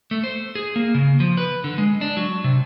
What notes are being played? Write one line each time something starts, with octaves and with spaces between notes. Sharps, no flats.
A3
C5
G#4
A#3
C#3
F3
B4
D3
G#3
D4
F#3
C3